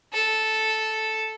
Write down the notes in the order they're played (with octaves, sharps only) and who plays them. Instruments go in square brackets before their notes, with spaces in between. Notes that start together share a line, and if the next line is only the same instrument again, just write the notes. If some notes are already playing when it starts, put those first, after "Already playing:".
[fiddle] A4